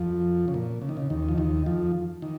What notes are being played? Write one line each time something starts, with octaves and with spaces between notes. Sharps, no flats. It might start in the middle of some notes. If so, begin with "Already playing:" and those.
Already playing: F2 F3
C#3
A#2
C#3
D#3
C#3
D#2 D#3
F3
D#2 D#3
F2 F3
D#3